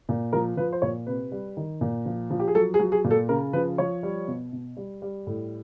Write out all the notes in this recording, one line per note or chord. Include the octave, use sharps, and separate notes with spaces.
A#2
F3 A#4
F3 B4
C5
A#2 C#5
C3 B4
G3
D#3
A#2
F3
F3
G4
G#4
F#3 A4
G#4
F#3
G#4
A#2
A4
C#3 A#4
F3 B4
F3 C#5
G3
B2
B2
G3
G3
A2